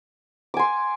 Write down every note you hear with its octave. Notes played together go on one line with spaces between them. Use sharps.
G#5 C6 D6